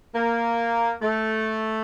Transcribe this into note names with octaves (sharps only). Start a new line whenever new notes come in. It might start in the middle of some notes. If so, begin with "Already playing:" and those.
A#3
A3